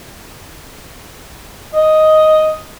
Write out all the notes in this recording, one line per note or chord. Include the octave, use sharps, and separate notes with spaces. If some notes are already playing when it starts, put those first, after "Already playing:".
D#5